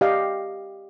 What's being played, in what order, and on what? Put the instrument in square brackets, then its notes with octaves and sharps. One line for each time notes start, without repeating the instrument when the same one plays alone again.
[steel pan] G4 D5 D#5 F5 G5